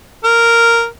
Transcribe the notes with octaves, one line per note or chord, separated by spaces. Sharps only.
A#4